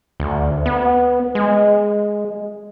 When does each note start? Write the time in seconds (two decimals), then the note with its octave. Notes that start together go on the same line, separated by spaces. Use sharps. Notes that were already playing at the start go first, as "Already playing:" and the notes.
0.20 D2
0.66 B3
1.35 G#3